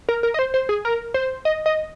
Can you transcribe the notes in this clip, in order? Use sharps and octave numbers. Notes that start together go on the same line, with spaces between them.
A#4
A#4
D#5
C5
C5
G#4
A#4
C5
D#5
D#5